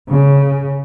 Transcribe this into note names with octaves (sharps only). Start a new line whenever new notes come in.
C#3